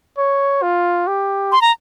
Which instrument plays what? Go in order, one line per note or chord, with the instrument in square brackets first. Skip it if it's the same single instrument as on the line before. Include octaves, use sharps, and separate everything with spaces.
[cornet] C#5
F4
G4
[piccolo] C6
A#5